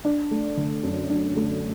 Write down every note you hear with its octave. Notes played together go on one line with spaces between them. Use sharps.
D4
A3
D3
F#2
D4
A3